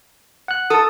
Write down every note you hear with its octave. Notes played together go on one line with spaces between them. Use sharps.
F#5 F#6
A4 A5 D#6